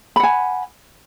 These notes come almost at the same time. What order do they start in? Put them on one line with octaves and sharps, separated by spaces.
B5 F#5 G#5